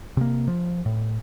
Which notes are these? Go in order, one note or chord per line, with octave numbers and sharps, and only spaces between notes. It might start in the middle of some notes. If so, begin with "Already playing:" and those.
C3 A#3
F3
A2